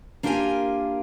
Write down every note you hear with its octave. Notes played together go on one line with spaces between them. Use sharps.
A#3 D4 F4 G4 A#4 G#5